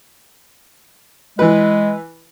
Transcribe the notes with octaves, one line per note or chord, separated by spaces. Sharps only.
E3 G#3 B4